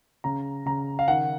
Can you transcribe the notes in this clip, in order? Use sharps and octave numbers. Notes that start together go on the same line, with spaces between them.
C#3 A#5
C#3 A#5
F5
D#3 F#5